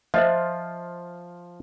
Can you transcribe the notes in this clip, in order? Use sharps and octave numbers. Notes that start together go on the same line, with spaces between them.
F3 F4 C5 D#5 E5